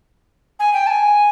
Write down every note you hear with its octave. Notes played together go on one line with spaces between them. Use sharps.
G#5
G5
A5
G#5